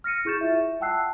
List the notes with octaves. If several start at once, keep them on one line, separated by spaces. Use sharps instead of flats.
F6 A#6 C#7 D#7
E4 G#4 C#6 G6 A6 E7
F4 E5
F#5 G5 A5 E6 F#6 C7